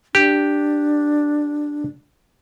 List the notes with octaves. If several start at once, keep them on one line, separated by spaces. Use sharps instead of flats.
D4 G4